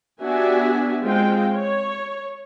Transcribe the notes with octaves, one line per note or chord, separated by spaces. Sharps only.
B3 D4 F#4 G4 E5 G#5
G#3 C4 F4 G5
C#5